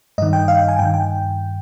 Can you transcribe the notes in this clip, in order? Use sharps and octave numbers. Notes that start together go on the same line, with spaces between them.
G2 D#3 D#5
G5
F5
G5
G#5
G2 D#3 G5
G5